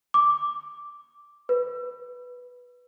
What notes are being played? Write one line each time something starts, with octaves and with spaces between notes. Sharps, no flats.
D6
B4